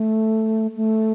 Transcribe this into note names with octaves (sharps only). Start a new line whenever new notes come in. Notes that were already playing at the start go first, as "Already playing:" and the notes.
Already playing: A3
A3